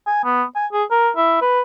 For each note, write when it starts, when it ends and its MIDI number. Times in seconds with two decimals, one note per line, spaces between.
0.07 0.23 80
0.24 0.43 59
0.56 0.67 80
0.72 0.84 68
0.91 1.10 70
1.16 1.37 64
1.41 1.62 71